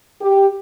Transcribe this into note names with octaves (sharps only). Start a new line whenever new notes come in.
G4